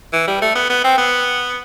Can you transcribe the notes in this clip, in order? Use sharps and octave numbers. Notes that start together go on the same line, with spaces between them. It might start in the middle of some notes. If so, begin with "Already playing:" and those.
E3
G3
A3
B3
B3
C4
B3